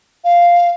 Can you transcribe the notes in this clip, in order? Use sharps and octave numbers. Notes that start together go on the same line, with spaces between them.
F5